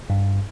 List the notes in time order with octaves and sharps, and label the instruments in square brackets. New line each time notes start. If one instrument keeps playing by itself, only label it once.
[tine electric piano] G2